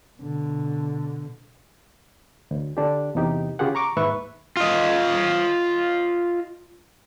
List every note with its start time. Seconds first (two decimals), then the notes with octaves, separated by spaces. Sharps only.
0.19 B2 D3
2.51 D2
2.77 D3 D4 G4
3.15 E2 C3 D#4 G4
3.59 C#3 F4 G4 G#4 F#5
3.75 A#5 C#6 D6
3.97 D#2 G#2 B4 E5 C#6
4.57 F4 D#5